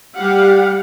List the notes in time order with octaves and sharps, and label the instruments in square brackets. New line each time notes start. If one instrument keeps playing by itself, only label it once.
[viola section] G3 G4 F5 F#5